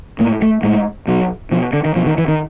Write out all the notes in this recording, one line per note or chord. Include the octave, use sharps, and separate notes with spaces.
A2 A#3
A3
A2 G#3
B2 F#3
B2 F3
D3
D#3
B2 F3
D#3
E3
D#3